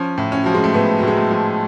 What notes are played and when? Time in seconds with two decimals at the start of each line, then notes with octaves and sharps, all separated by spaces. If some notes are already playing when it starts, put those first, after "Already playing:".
Already playing: F3 C#4
0.18 A2
0.32 C#4
0.44 F3 F#3
0.54 G#3
0.64 A3
0.74 A2 B3
0.99 F#3
1.03 A2 G#3
1.16 A3
1.31 F3